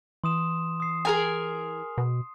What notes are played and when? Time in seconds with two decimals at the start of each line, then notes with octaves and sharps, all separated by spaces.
0.24 E3 C6 D#6 E7
0.80 D#6 C7
1.05 G#4 A#4 G#5
1.98 B2